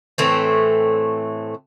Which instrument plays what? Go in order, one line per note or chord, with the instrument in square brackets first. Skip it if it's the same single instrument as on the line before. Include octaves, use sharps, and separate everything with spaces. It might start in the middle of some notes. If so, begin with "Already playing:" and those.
[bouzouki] A2 E3 A3 C4